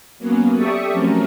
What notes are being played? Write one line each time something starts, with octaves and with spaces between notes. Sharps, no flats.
F#3 A#3 B3 C#4
G4 A4 D5 E5 C#6 D#6
F3 F#3 A3 C4 C#4 A#4